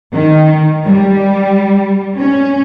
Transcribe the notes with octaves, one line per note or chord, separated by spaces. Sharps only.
D#3
G3
C#4